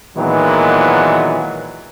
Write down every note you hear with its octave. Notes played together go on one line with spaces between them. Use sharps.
A#2 D#3 E3 F#3 G#3 B3